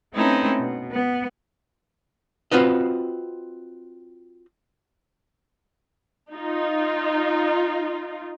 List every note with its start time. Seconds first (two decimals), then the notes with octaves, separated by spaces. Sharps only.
0.14 A3 C4 C#4 D#4 E4 B4
0.60 B2
0.92 B3
2.51 C4 F4 F#4 B4 D#5
6.32 D#4 F4